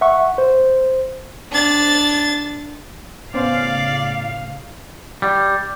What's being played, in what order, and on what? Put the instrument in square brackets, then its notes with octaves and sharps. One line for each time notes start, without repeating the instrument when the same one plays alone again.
[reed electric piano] E5 F#5 C#6
C5
[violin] D4 A6
[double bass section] A2 C#3 [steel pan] B3 C#4 C5 [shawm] D5 [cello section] F5
[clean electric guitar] G3